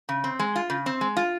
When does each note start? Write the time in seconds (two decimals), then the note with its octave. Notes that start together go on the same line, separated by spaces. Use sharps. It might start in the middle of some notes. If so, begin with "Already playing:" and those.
0.09 C#3
0.24 C4
0.39 G#3
0.56 F4
0.70 C#3
0.86 C4
1.01 G#3
1.17 F4